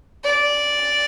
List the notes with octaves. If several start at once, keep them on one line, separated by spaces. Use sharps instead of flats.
D5